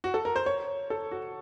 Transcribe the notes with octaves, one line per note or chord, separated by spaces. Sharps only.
F#4
A4
A#4
C5
C#5
A4
F#4